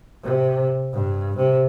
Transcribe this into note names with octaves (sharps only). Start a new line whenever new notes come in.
C3
G2
C3